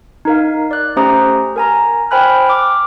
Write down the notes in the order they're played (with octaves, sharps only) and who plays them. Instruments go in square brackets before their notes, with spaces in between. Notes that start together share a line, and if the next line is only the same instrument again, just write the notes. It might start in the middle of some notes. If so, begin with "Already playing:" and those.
[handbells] D#4 A#4 F5
D5 F#6
A3 C#4 G4 C5 A#5 D#6
A#4 G#5 A#5
C5 G5 G#5 B5 F6 F#6
D6 F6